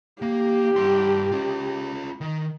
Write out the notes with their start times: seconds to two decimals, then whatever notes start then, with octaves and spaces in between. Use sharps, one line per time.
0.22 A#3 G4
0.76 G2 C6
1.32 C#4 F4
2.21 D#3